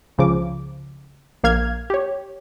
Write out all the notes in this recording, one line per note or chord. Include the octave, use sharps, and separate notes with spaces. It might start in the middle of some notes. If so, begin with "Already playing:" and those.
C#2 C#3 F3 D6
A#1 A#3 F5 F6 G#6
G4 C#5